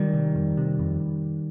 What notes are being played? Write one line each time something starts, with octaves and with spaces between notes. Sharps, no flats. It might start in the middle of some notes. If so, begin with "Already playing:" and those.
Already playing: D#3 G3
C3
F2
C3
F2